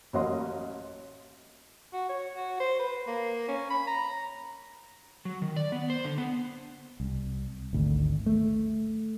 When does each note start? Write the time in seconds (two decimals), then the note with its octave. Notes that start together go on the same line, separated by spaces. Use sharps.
0.13 A1 F#3 A#3 D#5 C6
1.93 F#4
2.09 C#5
2.36 F#4
2.60 C5
2.80 B4
3.07 A#3
3.48 C#4
3.70 B5
3.87 A#5
5.25 F#3
5.42 D#3
5.56 D5
5.72 B3
5.90 C5
6.05 D3
6.18 B3
7.00 C2
7.73 G#1 D2
8.26 A3